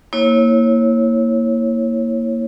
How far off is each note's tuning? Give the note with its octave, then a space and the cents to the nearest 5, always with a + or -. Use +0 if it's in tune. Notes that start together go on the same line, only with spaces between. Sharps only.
A#3 -5 E4 -25 C#5 -25